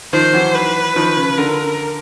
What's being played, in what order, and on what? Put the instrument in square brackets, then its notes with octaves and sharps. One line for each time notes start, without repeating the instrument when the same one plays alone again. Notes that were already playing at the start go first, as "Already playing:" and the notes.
[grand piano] D#3 F3 [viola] C5
[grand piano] E3 F#3
[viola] B4
[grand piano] D#3 F3
C#3
[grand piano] D3 [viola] A#4